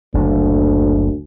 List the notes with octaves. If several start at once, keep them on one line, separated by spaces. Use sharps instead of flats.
F#1 D2